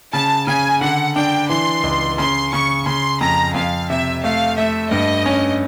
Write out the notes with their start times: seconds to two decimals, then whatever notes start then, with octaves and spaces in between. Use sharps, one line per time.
0.13 C#3 A5
0.47 C#3 G#5
0.81 D3 F#5
1.16 D4 G5
1.50 E3 C6
1.83 C#2
2.18 C#3 C6
2.52 C#3 C#6
2.86 C#3 C6
3.21 F2 A#5
3.54 F2 F5
3.89 C3 E5
4.24 A3 F5
4.58 A3 E5
4.91 G2 D#5
5.26 C#4